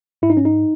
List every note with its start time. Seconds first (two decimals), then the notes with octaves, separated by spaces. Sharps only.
0.22 G#2 E4
0.30 D#4
0.37 C#4
0.45 D#4